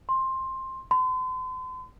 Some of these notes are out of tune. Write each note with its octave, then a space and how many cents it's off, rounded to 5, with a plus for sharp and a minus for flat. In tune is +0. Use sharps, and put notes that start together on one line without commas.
C6 +15
C6 -40